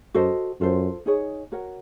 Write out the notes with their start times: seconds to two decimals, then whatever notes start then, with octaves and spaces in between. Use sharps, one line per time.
0.14 F#2 F#4 A4 C5 D#5
0.60 F#2 F4 A4 C5
1.06 D#4 G#4 C#5
1.52 F#4 A#4 C#5 F#5